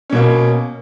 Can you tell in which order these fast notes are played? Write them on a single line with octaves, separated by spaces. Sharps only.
C#4 B2 A#3